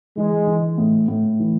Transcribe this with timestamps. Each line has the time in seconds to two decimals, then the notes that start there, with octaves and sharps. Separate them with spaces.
0.17 E3 G#3
0.47 E3
0.78 A2
1.08 A2
1.40 E3